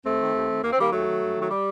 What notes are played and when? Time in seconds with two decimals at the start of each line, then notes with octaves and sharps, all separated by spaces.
0.06 D#2 A3 C4
0.20 D#3
0.34 D#2
0.50 D#3
0.63 D#2 A#3
0.73 C4
0.78 D#3 G3 A#3
0.93 D#2 F#3 A3
1.07 D#3
1.21 G2
1.36 D#3
1.42 F#3
1.50 G3